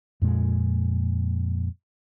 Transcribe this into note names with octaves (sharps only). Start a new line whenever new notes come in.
F2 A#2 G#3